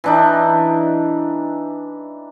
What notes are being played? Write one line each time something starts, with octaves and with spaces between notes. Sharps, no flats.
E3 D4 D#4